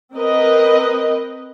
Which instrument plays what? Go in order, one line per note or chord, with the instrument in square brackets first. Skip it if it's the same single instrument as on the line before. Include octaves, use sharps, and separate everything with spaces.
[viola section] C4 A#4 B4 D#5